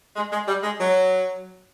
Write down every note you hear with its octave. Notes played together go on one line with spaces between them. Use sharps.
G#3
G#3
G3
G#3
F#3